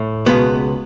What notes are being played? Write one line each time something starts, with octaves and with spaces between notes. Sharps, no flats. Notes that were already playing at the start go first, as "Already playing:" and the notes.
Already playing: A2
C#2 B2 G#3 B3